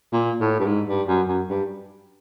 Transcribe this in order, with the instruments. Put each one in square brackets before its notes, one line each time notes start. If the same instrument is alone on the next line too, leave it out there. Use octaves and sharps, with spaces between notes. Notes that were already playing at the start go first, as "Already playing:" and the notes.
[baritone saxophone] A#2
A2
G2
G#2
G2
F#2
F#2
G2